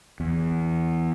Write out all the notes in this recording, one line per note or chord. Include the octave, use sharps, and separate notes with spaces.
E2